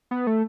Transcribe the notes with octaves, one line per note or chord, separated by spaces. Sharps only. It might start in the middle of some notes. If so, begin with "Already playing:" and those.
B3
A3